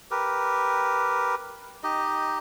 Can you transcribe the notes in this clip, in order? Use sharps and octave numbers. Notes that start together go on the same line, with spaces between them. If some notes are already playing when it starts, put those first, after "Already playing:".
G4 A#4 B4
D#4 G4 D#5